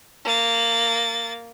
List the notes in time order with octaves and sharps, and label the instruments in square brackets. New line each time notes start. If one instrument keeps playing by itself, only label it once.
[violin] A#3 A6